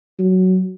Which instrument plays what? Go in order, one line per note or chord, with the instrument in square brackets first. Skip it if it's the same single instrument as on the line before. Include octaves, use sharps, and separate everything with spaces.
[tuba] F#3